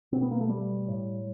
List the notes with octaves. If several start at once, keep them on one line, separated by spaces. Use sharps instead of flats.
B2 C4
B3
A#3
A3
G3
A2